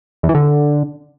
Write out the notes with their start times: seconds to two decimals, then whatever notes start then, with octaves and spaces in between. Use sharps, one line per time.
0.23 E2
0.29 E3
0.35 D3